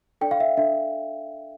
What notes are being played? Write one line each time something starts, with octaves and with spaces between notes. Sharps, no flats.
D4 A4 D5 G5
F5
E5
D4 A4 D5 E5